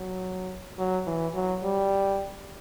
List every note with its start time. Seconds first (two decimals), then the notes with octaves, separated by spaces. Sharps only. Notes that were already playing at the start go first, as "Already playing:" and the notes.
Already playing: F#3
0.78 F#3
1.07 E3
1.35 F#3
1.64 G3